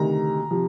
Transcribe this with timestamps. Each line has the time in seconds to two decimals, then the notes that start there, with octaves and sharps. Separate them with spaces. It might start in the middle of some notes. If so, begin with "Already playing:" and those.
Already playing: D2 C3 D#3 A#5
0.51 C3 F3